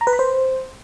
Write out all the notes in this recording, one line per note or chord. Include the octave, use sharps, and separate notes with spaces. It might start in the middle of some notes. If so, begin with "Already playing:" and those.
A#5
B4
B5
C5